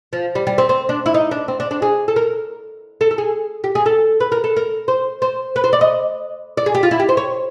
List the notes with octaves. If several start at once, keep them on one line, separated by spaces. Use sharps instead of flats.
F3
G3
G3
C4
C4
D4
E4
D#4
D4
C4
D4
D4
G#4
A4
A#4
A4
A4
G#4
G4
G#4
A4
B4
A#4
A4
A#4
C5
C5
B4
C5
D5
D#5
D5
G#4
G4
F4
E4
G4
C5
C#5